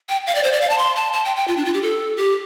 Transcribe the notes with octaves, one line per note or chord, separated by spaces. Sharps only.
G5
F5
D5
C5
D5
F5
A5
C6
A5
A5
G5
G5
F4
D4
F4
G4
A4
G4